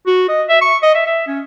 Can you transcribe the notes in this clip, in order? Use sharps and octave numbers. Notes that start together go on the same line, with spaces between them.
F#4
D#5
E5
C#6
D#5
E5
E5
C#4